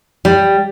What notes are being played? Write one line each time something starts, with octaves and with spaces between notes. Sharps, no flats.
G3